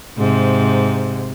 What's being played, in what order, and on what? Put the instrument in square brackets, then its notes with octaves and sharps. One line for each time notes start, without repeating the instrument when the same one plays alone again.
[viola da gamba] G#2 C3